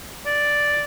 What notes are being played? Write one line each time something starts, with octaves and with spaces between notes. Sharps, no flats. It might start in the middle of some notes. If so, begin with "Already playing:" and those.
D5